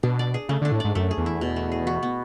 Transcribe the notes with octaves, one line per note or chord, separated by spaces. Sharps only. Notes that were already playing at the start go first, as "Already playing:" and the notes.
B2 D4
D5
G#4
C#3 A3
D3
D4
A2
G#2 D5
F#2 A3
G#4
E2
E4
B2
A3
G#4
F#4
B3